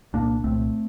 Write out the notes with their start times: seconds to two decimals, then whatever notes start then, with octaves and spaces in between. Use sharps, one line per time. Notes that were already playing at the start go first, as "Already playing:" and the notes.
0.13 C2 A#2 A#3 D4
0.44 C2 A#2 A3 C4